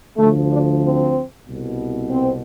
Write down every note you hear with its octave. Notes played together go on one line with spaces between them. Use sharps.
D2 D3 F3 A3
D4
C4
C2 B2
C4